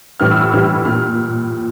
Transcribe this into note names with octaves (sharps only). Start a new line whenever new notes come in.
A2 E3 G3 F6
E6
E6
A2 E3 G3 F6
A#2 F6